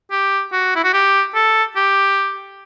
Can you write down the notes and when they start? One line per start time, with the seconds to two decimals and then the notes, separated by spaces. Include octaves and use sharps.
0.11 G4
0.52 F#4
0.75 E4
0.84 F#4
0.93 G4
1.35 A4
1.76 G4